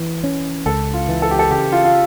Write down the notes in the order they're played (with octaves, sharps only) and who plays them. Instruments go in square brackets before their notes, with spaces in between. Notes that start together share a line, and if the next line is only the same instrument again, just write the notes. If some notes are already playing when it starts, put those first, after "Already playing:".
Already playing: [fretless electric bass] E3
C#4
[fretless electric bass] C#2 [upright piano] A4
[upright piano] F4
[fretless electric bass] E3
[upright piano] A4
G4
A4
[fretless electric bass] C#3 [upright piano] G4
[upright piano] F4
F4